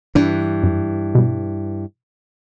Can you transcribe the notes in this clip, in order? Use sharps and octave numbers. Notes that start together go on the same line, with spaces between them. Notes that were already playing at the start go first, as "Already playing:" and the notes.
G2 E3 D4
F#2
B2 G3